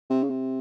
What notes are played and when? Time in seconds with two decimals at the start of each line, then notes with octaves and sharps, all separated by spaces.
0.10 C3
0.23 C#3
0.30 C3